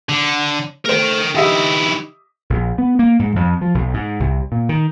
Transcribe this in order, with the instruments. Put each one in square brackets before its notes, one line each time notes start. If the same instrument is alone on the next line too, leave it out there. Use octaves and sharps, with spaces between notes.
[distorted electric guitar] D3
[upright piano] A3 A4 C5 [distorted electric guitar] A#4 G5
[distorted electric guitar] D#3 E4 [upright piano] G4 D#5 E5
[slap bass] A#1
B3
A#3
G#2
F2
F3
B1
G#2
C2
A#2
D#3